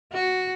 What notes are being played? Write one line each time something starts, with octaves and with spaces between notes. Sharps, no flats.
F#4